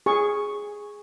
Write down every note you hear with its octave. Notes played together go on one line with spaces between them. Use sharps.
G#4 C#6